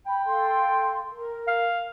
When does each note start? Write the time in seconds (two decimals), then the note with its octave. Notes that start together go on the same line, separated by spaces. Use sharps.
0.06 G5 B5
0.26 A4 F5 C6
1.12 A#4
1.48 F5